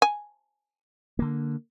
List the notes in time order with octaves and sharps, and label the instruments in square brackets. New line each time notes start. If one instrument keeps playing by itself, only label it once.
[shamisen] G#5
[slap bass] D3 A#3